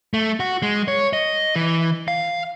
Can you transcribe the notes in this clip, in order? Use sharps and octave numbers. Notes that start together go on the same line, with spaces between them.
A3
F#4
G#3
C#5
D#5
E3
F5